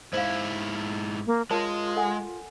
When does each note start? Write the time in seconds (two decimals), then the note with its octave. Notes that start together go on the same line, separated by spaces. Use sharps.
0.13 G#2 E4 C5 F5
1.26 A#3
1.51 G#3 F4 A#4 C#5 A5
1.96 A4 F#5 G#5